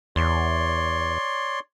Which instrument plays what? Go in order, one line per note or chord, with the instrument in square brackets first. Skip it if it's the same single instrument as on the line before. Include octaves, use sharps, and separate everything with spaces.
[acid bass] E2 [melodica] C#5 D5 C6